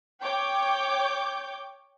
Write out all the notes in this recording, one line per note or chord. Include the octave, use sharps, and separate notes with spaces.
C#5 G5 D6 G6